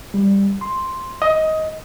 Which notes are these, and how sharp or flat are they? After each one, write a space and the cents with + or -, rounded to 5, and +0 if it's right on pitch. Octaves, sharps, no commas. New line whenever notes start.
G3 +15
C6 +5
D#5 +15